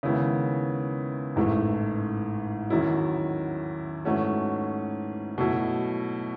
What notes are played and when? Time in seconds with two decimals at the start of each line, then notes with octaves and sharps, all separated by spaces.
0.03 D#2 C#3 G#3 B3 E4
1.36 A1 G#2 E3 A3
2.70 E2 D#3 F#3 C#4 E4
4.04 G#2 E3 A3 C#4 F#4
5.38 B2 F#3 A3 E4